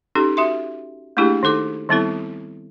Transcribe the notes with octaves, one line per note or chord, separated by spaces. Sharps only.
C#4 D#4 G4 A4
F#4 E5 C6
A3 A#3 D4 E4 G4 G#4
D#3 D#4 A4 D6
D#3 G3 B3 C4 E4 A4